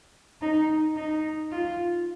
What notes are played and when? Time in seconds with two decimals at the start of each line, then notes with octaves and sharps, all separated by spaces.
0.42 D#4
0.97 D#4
1.52 F4